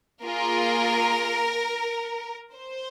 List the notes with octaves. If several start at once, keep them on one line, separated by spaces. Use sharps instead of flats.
A#3 F4 G#4 A#4
C5